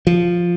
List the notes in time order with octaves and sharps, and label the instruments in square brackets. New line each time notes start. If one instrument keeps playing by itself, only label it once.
[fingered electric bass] F3